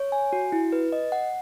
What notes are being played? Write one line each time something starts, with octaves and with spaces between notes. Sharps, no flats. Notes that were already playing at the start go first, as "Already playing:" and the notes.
Already playing: C#5
G#5
F#4
E4
B4
D#5
F#5